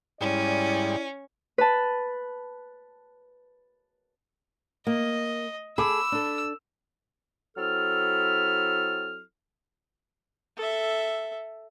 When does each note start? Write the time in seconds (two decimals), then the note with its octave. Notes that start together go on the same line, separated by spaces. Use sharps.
0.21 G#2 G3 C#4 E4 D5
1.58 B4 A5
4.87 A#3 D#5
5.78 G#4 A4 B5 D6 E6
6.12 D4 A4
7.57 F#3 C4 E4 A4 F6
10.57 A4 E5